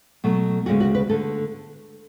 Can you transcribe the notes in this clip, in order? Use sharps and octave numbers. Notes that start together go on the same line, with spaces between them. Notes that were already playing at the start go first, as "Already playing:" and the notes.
B2 F#3 A3
D2 C#3 G#3 B3 F#4
F#4
B4
D3 A3 A4